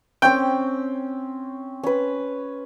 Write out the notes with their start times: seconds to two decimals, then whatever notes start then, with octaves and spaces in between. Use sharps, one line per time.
0.22 C4 C#4 G5
1.83 C#4 B4